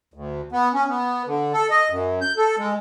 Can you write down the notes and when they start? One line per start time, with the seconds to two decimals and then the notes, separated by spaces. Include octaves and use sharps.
0.14 D2
0.52 B3
0.74 C#4
0.88 B3
1.26 D3
1.53 A4
1.70 D#5
1.89 F#2
2.21 G6
2.37 A4
2.58 G#3